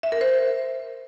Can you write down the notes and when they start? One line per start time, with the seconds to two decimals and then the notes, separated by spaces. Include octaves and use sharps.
0.03 E5
0.12 A#4
0.21 C5